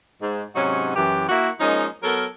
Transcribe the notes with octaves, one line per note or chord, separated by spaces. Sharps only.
G#2
G#2 C3 F#3 C#4 D#4 F#4
F#2 E3 G4
A#3 E4 F#4
F3 G#3 A#3 C#4 D#4
F#3 B3 A4 A#4